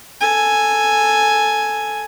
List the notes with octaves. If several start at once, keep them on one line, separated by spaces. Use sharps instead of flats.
A4 G#5